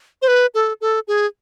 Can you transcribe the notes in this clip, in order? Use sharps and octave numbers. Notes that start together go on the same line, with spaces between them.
C5
B4
A4
A4
G#4